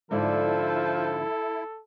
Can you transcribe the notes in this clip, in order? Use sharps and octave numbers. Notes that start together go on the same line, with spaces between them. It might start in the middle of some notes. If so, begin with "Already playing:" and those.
G#2 D3 F3 E4 A4 D5